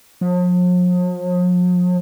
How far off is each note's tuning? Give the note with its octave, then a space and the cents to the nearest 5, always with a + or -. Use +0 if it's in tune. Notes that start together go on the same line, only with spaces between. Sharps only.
F3 +45